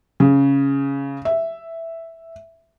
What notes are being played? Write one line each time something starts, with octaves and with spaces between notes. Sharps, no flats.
C#3
E5